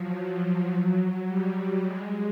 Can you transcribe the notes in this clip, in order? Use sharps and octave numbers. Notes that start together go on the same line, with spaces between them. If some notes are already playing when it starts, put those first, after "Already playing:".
Already playing: F3 F#3
F#3
G3
G#3